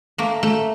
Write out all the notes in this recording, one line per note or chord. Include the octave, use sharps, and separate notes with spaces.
A3 A#3
A3